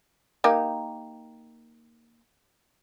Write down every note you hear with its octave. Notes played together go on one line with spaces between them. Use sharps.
A#3 D#4 G4